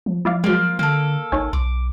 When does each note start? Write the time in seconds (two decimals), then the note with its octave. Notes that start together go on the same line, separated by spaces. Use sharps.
0.06 F3
0.25 F3 E4 D5 F5
0.44 F#3 G#3 A#3 F4
0.79 D3 A#3 A4
1.32 G#1 D#4 C#5 G#5
1.53 B1 D6